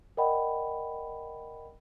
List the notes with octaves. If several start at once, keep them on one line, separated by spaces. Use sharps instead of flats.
A#4 D5 D#5 F#5 G5 B5